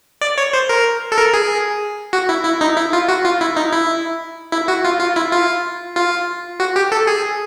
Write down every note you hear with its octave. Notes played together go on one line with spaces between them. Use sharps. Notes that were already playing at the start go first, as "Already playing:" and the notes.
D5
C#5
C5
A#4
A4
A#4
G#4
F#4
E4
E4
D#4
E4
F4
F#4
F4
E4
D#4
E4
E4
F#4
F4
F4
E4
F4
F4
F#4
G4
A4
G#4